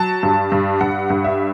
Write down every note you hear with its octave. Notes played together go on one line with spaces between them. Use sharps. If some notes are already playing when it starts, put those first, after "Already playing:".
Already playing: F#3 A5
G2
G2
G2 F#5
G2
E5